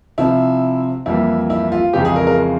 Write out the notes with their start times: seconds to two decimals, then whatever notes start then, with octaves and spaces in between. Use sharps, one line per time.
0.18 C3 F3 C4 E4
1.06 F2 E3 G3 A#3 E4
1.50 E4
1.72 F4
1.93 F2 C#3 E3 G#3 C4 G4
2.05 G#4
2.16 A#4
2.27 A#4